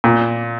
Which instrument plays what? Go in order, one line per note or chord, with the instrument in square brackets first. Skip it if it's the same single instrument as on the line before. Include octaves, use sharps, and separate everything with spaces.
[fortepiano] A#2